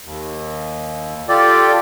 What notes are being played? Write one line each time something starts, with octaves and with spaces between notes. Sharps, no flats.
D#2
F4 G4 A4 D5